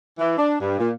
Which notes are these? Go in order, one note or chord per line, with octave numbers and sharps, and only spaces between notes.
E3
D4
G2
A#2